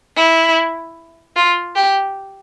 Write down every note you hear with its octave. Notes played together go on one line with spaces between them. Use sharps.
E4
F4
G4